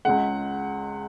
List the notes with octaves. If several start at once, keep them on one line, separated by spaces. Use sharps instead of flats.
C#2 C#3 G#3 F#5